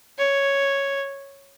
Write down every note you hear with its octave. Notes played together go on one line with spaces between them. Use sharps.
C#5